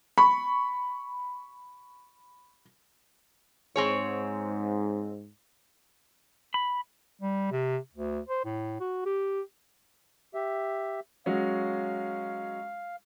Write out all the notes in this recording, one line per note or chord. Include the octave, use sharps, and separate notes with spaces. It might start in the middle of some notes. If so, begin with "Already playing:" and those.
B5 C#6
G#2 C4 G#4 C#5
B5
G3
C3
D2
C5
A2
F#4
G4
G4 E5
F#3 G#3 C#4 F5